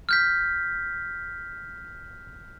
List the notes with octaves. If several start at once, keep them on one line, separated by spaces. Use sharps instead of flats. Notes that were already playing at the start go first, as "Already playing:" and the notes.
F6 G6 B6